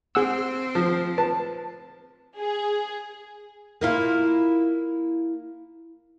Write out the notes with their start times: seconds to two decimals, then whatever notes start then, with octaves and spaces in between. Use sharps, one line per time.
0.15 C4 G#4 F#5 E6
0.75 F3
1.18 B4 A5
2.37 G#4
3.81 A#3 E4 F4